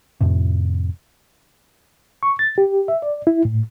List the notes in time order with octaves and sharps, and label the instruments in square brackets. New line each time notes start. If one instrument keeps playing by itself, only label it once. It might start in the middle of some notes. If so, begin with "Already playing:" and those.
[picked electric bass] F2 A2 C3
[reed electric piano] C#6
A6
G4
E5
D5
E4
A2